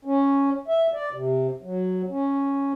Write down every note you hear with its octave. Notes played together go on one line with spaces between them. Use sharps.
C#4
E5
D5
C3
F#3
C#4